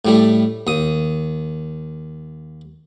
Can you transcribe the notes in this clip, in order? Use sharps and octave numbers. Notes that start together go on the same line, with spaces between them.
A2 G3 A3
D#2 D#6